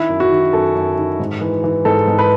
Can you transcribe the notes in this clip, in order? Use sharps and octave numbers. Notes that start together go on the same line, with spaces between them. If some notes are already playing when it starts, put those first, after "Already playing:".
Already playing: D#3 E4
F#2
F#4
D#3
F#2 A4
F#2
D#3
G#2
E3
E3
G#2 A4
G#2
B4